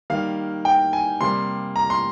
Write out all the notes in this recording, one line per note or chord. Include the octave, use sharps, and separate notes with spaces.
D#3 G3 A#3 F5
G5
G#5
C3 G3 A#3 C6
A#5
C6